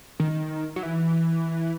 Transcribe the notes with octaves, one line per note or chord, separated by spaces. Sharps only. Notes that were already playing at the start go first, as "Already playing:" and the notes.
D#3
F#3
E3